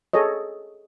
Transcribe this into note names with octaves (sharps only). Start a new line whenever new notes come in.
G#4 A4 C#5 D#5